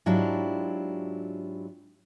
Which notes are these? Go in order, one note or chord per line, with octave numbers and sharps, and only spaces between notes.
G#2 F#3 D4 E4 F4 G4